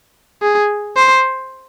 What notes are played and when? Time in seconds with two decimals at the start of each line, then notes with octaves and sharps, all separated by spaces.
0.42 G#4
0.96 C5